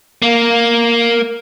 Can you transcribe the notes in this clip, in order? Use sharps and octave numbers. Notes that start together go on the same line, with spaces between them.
A#3